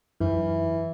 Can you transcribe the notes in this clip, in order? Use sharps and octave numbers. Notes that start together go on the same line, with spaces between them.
F#2 E3